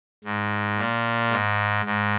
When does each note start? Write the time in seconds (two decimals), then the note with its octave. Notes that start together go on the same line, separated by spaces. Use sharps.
0.24 G#2
0.78 A#2
1.31 G#2
1.85 G#2